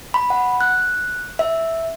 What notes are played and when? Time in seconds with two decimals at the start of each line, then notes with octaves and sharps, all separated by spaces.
0.14 B5
0.30 F#5
0.61 F#6
1.39 E5